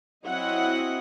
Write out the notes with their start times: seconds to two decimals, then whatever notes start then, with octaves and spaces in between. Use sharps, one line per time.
0.25 F#3 C4 E4 D#5 F#5